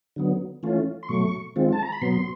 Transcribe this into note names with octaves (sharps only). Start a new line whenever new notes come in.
D3 F#3 B3
E3 A3 C#4 F4
C6
B2 F#3 A3 C#6
D#3 G#3 C4 F4
A5
A#5
B5
B2 F#3 B3 C6